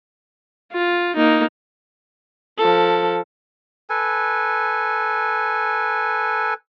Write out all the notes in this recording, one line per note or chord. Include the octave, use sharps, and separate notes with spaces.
F4
A#3 D#4
F3 A4
A4 B4 G#5